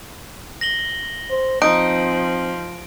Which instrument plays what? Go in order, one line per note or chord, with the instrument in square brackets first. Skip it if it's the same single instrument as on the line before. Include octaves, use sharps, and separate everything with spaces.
[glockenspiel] A#6 F#7 G7
[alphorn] C5
[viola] F3 [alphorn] C4 [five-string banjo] D#4 [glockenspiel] D7